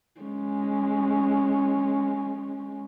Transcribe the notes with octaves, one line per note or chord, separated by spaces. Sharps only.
G#3 C#4